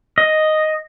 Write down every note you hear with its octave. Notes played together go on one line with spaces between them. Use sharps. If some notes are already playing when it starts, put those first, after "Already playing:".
D#5